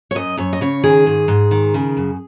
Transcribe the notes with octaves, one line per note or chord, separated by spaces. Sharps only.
C#5
F#2 D#5
F#2 C#5
D#5
C#3 C#5
D#3 G#4
G#2
G#2
D#3
C#3
F#2